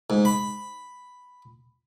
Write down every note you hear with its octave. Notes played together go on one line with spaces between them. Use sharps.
G#2
B5